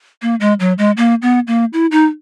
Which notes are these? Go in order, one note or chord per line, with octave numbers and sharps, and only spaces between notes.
A#3
G#3
F#3
G#3
A#3
B3
A#3
E4
D#4